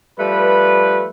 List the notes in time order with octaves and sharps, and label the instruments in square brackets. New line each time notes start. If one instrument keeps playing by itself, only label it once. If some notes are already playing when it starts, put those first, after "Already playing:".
[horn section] F3 G3 A3 B4